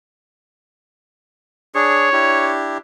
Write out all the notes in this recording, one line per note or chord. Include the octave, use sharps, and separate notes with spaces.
D4 G#4 C#5
D4 E4 G4